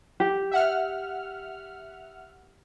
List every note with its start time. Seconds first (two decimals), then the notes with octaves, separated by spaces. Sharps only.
0.20 G4
0.51 E5 F#5 F6